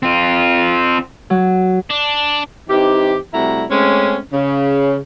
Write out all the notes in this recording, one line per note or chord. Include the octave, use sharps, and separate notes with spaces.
C4 F4
F#3
D4
E3 C4 D#4 G4
C3 G3 A3 E4 F#4 A#5
G#3 A3 C4 C#4
C#3